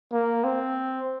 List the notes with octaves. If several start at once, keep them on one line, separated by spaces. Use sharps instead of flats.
A#3
C4